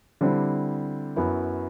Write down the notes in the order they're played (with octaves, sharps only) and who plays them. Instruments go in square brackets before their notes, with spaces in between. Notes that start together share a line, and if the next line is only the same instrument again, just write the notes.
[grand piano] D3 G3 C4 E4
F#2 F#3 B3 E4